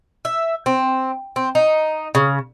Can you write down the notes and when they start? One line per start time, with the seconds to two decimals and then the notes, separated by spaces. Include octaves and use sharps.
0.25 E5
0.66 C4
1.36 C4
1.55 D#4
2.15 C#3